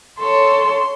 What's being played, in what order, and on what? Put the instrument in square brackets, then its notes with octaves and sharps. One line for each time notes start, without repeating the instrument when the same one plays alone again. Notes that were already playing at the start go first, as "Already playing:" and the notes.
[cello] A4 C#5 [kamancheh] C6